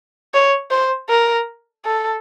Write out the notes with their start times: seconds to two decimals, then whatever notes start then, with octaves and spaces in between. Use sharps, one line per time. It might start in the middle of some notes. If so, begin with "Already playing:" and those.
0.34 C#5
0.71 C5
1.09 A#4
1.85 A4